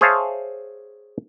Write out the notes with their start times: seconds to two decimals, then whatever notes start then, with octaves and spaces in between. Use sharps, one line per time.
0.01 G#4 C5 C#5 E5 F5 A5